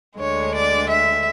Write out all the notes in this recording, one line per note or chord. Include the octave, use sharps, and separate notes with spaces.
D2 D3 G#3 C#5
D5
E5